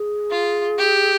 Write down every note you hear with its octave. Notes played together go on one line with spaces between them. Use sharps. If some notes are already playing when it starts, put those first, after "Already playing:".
Already playing: G#4
F4
G4